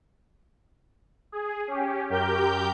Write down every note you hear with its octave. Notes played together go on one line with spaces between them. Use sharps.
G#4
C#4 G4
F#2 G4 A#4 G5 G6